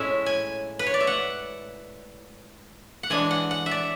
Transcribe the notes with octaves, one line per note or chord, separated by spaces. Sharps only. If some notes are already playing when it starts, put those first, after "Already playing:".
Already playing: A2 G#3 C#4 E4 E5
G#5
B4
C#5
D5
E5
F#5
F#5
E3 G#3 D4 G#5
F#5
F#5
E5
D5